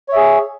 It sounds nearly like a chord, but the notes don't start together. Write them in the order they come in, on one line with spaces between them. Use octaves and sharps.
C#5 E5 G#4